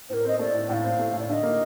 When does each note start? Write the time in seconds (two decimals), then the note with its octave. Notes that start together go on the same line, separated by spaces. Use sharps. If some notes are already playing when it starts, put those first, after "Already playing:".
0.10 A2 A#4 C5
0.25 C4 D#5
0.39 A3 D5
0.54 A2
0.69 A2 F5 G5
0.84 C4
0.99 A3
1.13 A2
1.19 D5
1.29 D3 D#5 F5
1.43 A#3